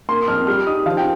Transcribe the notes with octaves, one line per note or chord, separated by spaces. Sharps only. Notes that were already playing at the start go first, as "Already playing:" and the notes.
A#3 C6
F2 F6
G3 F6
D#4 D#6
F3 F5
G5